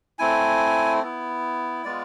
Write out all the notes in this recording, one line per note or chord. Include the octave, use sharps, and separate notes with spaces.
A3 C4 E4 G#5
B3 E4
G#3 B3 F4 D5